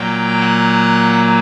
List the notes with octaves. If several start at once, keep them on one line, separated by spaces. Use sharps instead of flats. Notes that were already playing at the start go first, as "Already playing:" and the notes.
Already playing: A#2 F#3 A#3 G5
F#5